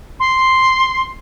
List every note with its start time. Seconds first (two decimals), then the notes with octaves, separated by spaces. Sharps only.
0.20 C6